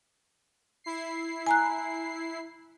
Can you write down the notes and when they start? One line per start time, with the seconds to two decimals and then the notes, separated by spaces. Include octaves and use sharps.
0.84 E4 C7
1.47 G#5 A#5 F#6